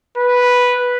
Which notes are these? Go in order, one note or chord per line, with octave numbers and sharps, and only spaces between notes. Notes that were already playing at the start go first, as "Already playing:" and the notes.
B4